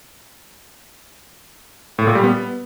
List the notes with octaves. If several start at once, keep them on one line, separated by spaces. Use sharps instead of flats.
A2
A#2
G3
B3